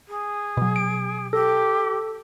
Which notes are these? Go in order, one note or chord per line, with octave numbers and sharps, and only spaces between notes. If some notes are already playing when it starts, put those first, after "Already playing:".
G#4
B2 F#3
D7
G4 A4